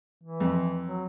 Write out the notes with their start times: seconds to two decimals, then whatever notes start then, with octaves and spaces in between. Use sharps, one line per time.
0.23 E3
0.40 F2
0.87 F#3